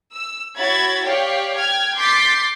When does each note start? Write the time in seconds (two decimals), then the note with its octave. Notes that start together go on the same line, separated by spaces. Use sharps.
0.14 E6
0.56 E4 F#4 C#5 B5 G#6 A6
1.06 G4 C#5 D5 F5 G5
1.57 G5 F6 G#6
1.97 C6 D6 G6 A6 B6 C7